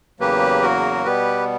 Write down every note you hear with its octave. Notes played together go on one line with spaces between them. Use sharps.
E2 C#3 F#3 A#3 G4 B4
F#4 A#4
B2 G3 B3 G4 B4